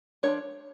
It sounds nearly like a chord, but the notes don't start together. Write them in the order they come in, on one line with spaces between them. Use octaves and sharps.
A3 D4 C#5 F3